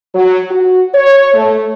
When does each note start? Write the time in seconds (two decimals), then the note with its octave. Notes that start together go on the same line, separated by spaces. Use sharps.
0.15 F#3
0.51 F#4
0.94 C#5
1.34 A3